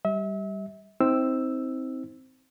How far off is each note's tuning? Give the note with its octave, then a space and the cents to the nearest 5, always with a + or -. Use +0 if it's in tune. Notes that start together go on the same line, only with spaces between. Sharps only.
G3 +0 E5 -35
C4 +0 D#4 +40 E6 +0